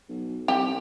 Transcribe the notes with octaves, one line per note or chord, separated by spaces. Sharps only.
B1
C2 G4